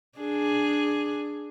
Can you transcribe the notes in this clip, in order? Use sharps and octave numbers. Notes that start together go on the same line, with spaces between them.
D4 G#4